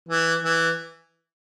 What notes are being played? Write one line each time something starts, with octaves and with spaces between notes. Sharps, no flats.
E3
E3